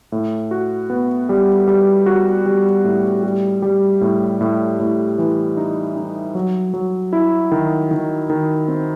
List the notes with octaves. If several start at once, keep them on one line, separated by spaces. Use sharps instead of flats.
A2
F#4
B3
G3
G3
F#4
G3
A2
G3
G3
A2
A2
A2
E3
D#4
D#4
F#3
F#3
E4
D#3
D#3
D#3
C4